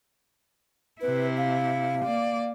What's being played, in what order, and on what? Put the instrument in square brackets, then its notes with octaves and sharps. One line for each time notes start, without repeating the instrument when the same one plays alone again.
[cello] C3 E4 [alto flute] B4
[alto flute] F5
[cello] A#3 D5